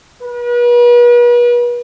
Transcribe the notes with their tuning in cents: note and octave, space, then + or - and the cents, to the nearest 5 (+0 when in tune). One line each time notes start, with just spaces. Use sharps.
B4 -40